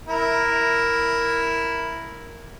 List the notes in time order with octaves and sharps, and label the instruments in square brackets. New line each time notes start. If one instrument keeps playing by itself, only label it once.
[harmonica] E4 A#4